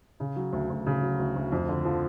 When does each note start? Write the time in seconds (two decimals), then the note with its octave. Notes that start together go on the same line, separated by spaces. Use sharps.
0.20 C#3
0.36 F#3
0.53 D2
0.70 D2
0.87 C#3
1.02 F#3
1.19 D2
1.36 D2
1.52 F2
1.69 D3
1.85 F3